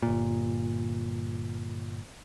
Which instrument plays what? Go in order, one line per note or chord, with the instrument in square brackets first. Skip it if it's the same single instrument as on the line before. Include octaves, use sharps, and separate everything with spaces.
[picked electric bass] G1 A#2